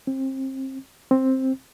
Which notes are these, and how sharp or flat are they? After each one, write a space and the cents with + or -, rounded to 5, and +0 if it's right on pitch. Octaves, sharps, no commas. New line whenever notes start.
C4 +30
C4 +10